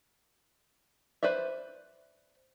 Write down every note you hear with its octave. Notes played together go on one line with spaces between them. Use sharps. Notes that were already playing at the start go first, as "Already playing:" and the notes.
B4 C5 D5 E5